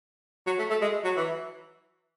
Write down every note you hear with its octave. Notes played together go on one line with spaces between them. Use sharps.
F#3
A3
A3
G#3
F#3
E3